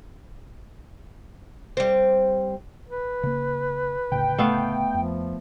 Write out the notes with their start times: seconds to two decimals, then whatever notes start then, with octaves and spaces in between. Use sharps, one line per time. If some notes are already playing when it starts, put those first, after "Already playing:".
1.77 G3 C4
2.89 B4
3.23 C#3 A#3
4.12 D2 A2 C#3 G5
4.38 A3 B3 F5
4.94 F2 F3